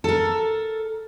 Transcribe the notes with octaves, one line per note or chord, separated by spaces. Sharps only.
A4 A#4